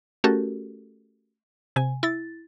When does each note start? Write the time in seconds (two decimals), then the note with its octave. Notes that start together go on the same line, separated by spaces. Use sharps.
0.24 A3 C#4 F#4 G4 A4 A#4
1.76 C3 G#5
2.03 E4 A6